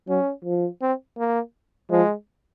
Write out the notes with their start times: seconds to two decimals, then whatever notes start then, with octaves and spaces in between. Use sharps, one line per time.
0.08 F#3 C#4
0.45 F3
0.82 C4
1.18 A#3
1.90 F3 G#3